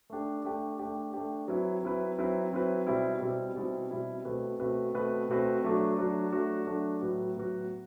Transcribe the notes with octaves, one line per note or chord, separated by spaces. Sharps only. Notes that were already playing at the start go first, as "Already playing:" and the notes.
A3 D4 G4
A3 D4 G4
A3 D4 G4
A3 D4 G4
F#3 C4 E4 B4
F#3 C4 E4 B4
F#3 C4 E4 B4
F#3 C4 E4 B4
B2 G3 C4 E4
B2 G3 C4 E4
B2 G3 C4 E4
B2 G3 C4 E4
B2 A3 C4 F#4 B4
B2 A3 C4 F#4 B4
B2 A3 C4 F#4 B4
B2 A3 C4 F#4 B4
F#3 A3 D4 F#4
F#3 A3 D4 F#4
F#3 A3 D4 F#4
F#3 A3 D4 F#4
A2 F#3 B3 F#4
A2 F#3 B3 F#4